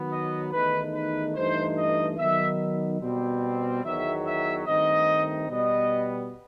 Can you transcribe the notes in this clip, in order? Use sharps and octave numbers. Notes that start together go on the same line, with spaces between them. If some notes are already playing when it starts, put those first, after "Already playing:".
Already playing: D#3 F#3 B3
D#5
E2 D#3 A3 D#4 B4
B4
G2 E3 A3 D#4 C5
D#5
D#3 F#3 B3 D#4 E5
B2 G3 C4
E2 D#3 F#3 E5
E5
G2 D#3 A3 C4 D#4 D#5
B2 G3 B3 D#5